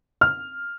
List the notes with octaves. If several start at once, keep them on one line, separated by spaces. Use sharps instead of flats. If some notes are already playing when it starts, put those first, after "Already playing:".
F6